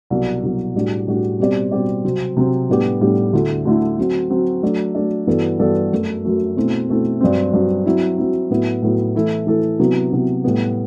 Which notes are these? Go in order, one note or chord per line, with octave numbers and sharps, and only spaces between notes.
C2 B2 F#3
C2 B2 F#3
A2 G3 D4 F#4
A2 G3 D4 F#4
B2 G3 C4 G4 D5
B2 G3 C4 G4 D5
C3 F#3 C4
C3 F#3 C4
A2 G3 B3 D4 G4
A2 G3 B3 D4 G4
D2 D3 A3 E4
D2 D3 A3 E4
F#3 C4 F#4
F#3 C4 F#4
F#3 A3 D4
F#3 A3 D4
G2 E3 B3 F#4 A4
G2 E3 B3 F#4 A4
F#2 F#3 A3
F#2 F#3 A3
B2 A3 C4 E4
B2 A3 C4 E4
G2 F#3 C4
G2 F#3 C4
F#3 C4 E4
F#3 C4 E4
A2 F#3 B3 E4
A2 F#3 B3 E4
E3 A3 E4 A4
E3 A3 E4 A4
C3 F#3 B3 E4
C3 F#3 B3 E4
A2 G3 B3